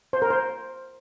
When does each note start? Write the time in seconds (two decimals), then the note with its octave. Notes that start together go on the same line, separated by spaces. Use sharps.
0.13 C5
0.22 A#4
0.30 C5